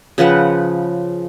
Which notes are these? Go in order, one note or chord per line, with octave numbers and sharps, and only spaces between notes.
C#3 F3 B4 F#5